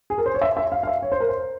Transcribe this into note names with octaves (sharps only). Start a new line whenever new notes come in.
G#4
A#4
C5
C#5
E5
E5
F5
F5
E5
C#5
C5
A#4
C5